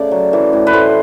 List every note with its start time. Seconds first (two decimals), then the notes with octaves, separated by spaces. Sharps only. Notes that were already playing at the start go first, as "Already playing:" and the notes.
Already playing: C#3 A3 D5
0.11 F#3
0.33 E3
0.53 A2
0.67 B4
0.73 A2 C5